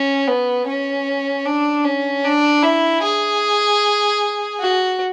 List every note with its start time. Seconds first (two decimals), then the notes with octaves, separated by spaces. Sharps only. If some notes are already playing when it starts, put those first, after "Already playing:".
Already playing: C#4
0.27 B3
0.66 C#4
1.45 D4
1.84 C#4
2.24 D4
2.62 E4
3.02 G#4
4.60 F#4